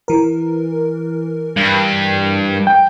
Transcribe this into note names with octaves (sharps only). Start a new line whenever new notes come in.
E3 A#4
G2
G5